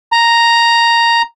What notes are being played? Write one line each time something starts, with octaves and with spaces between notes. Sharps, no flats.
A#5